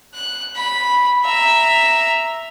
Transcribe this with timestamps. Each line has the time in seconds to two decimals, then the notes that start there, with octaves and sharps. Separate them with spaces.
0.14 F#6
0.56 B5
1.25 E5 A#5